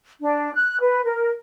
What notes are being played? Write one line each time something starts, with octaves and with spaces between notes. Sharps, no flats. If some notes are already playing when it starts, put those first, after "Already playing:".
D4
F#6
B4
A#4